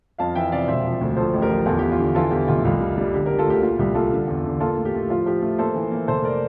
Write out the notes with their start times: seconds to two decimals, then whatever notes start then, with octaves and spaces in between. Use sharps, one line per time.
0.18 F2 F5 A5
0.35 E3 E5 G5
0.52 C3 D5 F5
0.68 E1 C5 E5
0.85 F3
1.01 D2
1.17 F3 A4 C5
1.34 A1
1.41 G4 A#4
1.51 F3
1.66 E2 F4 A4
1.79 G4
1.83 E2
1.91 F4
1.99 D3
2.15 E3 F4 A4
2.31 E2 G4
2.48 F1 F4
2.65 C2 F4
2.81 G3
2.98 G3
3.13 D3 G4
3.25 G4 A#4
3.30 G3
3.39 F4 A4
3.47 D2 G4
3.62 A#2 F4
3.79 C2 G4
3.95 A#2 F4 A4
4.12 D3
4.28 E2
4.45 D3
4.60 A#3 F4 A4
4.77 A2
4.85 G4
4.94 A2
5.09 F3 F4
5.26 F3 G4
5.42 A3
5.59 A#3 A4 C5
5.75 E3
5.92 A#3
6.07 F1 A4 C5
6.24 A#4 D5